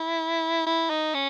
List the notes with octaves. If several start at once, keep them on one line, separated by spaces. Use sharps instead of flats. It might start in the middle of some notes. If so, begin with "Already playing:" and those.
Already playing: E4
E4
D#4
C#4